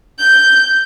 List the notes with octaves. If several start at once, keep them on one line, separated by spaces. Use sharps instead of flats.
G6